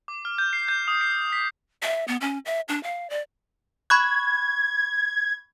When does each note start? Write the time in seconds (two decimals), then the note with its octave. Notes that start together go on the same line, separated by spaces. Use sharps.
0.08 D6
0.25 F6
0.38 G6
0.53 C7
0.68 G6
0.88 D#6
1.01 C7
1.33 B6
1.83 E5
2.08 B3
2.21 C#4
2.46 E5
2.69 D4
2.83 F5
3.10 D5
3.90 B5 C#6 F#6 G#6